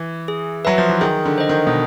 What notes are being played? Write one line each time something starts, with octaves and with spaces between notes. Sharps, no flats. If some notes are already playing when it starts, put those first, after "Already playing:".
Already playing: E3
G#4
F#3 B4 E5
F3
E3
D#3 G#4
D3
C5 D#5
D#3
B2